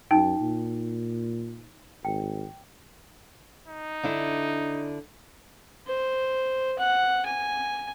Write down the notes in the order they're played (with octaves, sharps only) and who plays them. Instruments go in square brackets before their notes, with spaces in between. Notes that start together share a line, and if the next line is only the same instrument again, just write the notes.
[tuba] F#2 [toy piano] D#4 [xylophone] G5
[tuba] A#2
[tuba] G#1 [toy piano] G5
[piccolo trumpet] D#4
[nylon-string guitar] D3 D4 E4
[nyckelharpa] C5
F#5
G#5